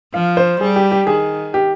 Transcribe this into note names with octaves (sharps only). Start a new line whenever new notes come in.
F3 F5
C5
G3 G#4
G4
G4
D#3 G#4
G4